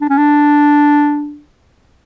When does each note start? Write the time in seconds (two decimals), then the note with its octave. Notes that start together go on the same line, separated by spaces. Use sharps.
0.01 D4
0.09 C#4
0.17 D4